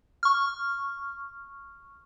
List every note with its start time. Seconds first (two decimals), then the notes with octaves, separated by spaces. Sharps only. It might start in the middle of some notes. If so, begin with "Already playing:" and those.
0.23 C#6 F6